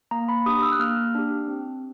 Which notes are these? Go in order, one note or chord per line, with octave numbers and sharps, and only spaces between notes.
A#3 A#5
B5
D4 G4 D#6
E6
F#6
A#3 F6
D4 G4
C4